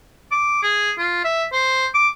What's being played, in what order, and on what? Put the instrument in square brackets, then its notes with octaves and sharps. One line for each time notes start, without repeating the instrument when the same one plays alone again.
[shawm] D6
G#4
F4
E5
C5
D6